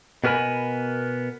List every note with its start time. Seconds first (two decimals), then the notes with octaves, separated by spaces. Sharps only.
0.24 B2 B3 A#4 G#5 B5